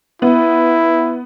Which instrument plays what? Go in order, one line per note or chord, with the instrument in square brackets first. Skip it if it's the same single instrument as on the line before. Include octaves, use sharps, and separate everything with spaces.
[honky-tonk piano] B3 [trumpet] E4